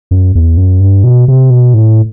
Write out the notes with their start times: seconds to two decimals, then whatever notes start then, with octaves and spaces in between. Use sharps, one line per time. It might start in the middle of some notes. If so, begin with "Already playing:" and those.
0.11 F#2
0.35 E2
0.57 F#2
0.80 G2
1.04 B2
1.28 C3
1.50 B2
1.74 A2